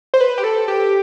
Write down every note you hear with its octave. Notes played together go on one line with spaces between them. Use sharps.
C5
B4
G4
A4
G4